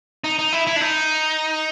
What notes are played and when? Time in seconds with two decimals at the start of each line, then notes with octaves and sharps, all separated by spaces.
0.24 D#4
0.39 D#4
0.53 E4
0.67 E4
0.76 D4
0.81 D#4